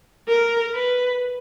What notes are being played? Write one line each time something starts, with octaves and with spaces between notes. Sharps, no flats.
A#4
B4